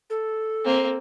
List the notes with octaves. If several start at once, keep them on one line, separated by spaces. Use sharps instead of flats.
A4
A#3 C4